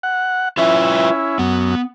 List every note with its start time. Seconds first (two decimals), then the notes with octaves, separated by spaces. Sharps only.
0.03 F#5
0.57 C#4 E4 F4 B4 E5
1.39 F#2 B3